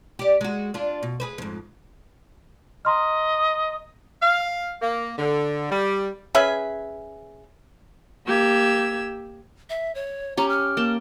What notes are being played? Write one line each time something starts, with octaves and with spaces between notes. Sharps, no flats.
G4 D5
G#3 F#4
D4 F4
B2
G#4 B4 C5
F2 G#2
D#5 A#5 C6 F6
F5
A#3
D3
G3
C#4 G#4 B4 E5
A#3 G4 E6 G#6
E5
C#5
C#4 G4 A#5
F6
A#3 G5 A5